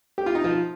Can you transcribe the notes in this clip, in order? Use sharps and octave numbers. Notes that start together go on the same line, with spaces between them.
G4
F4
D#4
F3 F4